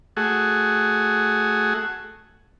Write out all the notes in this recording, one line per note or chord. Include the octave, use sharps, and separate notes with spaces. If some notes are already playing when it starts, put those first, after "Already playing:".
A3 F#4 G#4